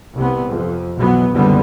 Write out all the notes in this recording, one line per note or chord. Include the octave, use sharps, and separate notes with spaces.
C2 C3 B3
F2
B1 B2 E3 F#3 B3
F#1 C2 D3 G3 B3